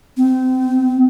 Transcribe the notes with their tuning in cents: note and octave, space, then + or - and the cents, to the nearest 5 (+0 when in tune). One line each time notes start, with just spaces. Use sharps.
C4 -30